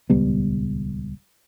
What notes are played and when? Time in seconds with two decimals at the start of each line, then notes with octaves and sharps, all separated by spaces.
0.10 D#1 C#2 G3 B3